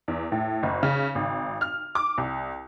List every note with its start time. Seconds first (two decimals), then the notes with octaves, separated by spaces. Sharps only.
0.08 E2
0.32 A2
0.63 F#1
0.83 C#3
1.15 G#1
1.61 F6
1.95 D6
2.18 C2